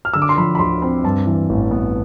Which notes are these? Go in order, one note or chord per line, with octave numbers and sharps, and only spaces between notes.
F6
D3 E6
D6
C6
F3 B5
B5
D2 C6
C4 B5
G2 A5
E3
A1
B3